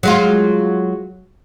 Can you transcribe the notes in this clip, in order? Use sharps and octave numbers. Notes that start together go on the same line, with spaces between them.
F#3 G#3 F4